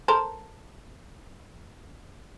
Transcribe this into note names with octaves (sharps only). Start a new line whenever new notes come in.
A4 A#4 C5